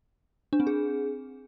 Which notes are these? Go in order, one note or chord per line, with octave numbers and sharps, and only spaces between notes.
D4
C4
G#4